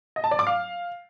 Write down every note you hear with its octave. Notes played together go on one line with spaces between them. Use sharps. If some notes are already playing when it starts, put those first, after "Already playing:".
D#5
A5
D5
D6
F5